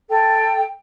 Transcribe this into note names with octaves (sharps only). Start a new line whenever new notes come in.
A4 G5